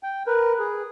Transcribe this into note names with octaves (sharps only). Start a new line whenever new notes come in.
G5
A#4 B4
G#4